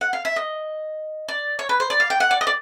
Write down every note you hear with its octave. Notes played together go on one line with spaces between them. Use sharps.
F#5
F5
E5
D#5
D5
C#5
B4
C5
D5
F5
G5
F#5
D5
D#5
D5